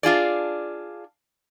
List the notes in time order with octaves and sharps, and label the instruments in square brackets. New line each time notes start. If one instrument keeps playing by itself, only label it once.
[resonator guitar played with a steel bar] D4 F4 G#4 D5